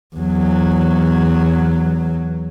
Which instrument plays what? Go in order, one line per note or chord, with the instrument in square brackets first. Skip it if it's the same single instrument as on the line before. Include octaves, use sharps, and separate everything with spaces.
[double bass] E2 F#3